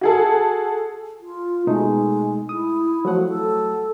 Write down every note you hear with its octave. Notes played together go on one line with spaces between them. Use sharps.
F#4 G#4 A4
F4
B2 G#3 A3 D#4
E4 D#6
F3 F#3 A3 F#5
A4